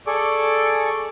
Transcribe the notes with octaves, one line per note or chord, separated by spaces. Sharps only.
G#4 A4 D5 C#6 D6